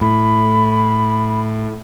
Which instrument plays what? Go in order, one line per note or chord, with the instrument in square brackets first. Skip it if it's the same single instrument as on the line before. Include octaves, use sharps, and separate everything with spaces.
[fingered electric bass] A2 [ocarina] B5